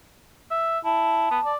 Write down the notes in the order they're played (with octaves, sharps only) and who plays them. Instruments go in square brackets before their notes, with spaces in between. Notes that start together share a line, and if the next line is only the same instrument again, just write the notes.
[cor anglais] E5
[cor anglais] E4 [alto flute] A5
[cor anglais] B3
D5